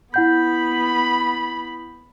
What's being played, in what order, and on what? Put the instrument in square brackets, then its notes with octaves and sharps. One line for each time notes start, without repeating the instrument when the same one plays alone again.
[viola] B3 B5 [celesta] E4 F#5 G6